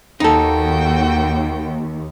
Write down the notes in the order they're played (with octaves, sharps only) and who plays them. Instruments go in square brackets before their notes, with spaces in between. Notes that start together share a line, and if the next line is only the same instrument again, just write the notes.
[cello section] D#2 [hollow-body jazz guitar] D#4 A4 [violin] F#4 G5